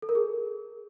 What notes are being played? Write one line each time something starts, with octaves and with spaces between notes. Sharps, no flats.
A4
A#4
G#4